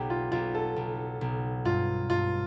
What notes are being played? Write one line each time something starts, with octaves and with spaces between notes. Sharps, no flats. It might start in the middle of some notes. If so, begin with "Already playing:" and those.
Already playing: B1 G4
F4
B1 F4
A4
B1
B1
G2 F4
G2 F4